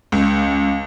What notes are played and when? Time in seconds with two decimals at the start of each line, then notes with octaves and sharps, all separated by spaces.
0.12 C#2